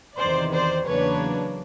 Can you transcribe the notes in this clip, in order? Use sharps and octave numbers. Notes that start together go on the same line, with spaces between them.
E2 C3 D#3 C5 D5
C5 D5
E2 C#3 F#3 A#3 D4 B4 C#5